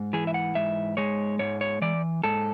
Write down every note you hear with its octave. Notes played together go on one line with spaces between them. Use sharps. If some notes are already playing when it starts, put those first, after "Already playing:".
Already playing: G#2
E3 G#4
E5
F#5
G#2 E5
G#3 C#5
G#2 C#5
C#5
E3 D5
G#2 A4